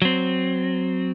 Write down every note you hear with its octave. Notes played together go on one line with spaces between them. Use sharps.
F#3 C4